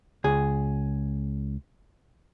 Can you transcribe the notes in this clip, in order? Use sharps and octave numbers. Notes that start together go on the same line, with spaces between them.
C#2 G#4